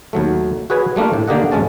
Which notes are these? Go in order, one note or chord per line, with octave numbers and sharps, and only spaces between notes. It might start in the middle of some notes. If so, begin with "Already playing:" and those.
D#2 F#3 A3
F#4 G#4 B4 C#5 G#5
G3 A3 A#3 D4 F4
A2
D#2 D3 A#3 G4 D#5 F#5
G#1 F#2 G#3 A3 C#4 A5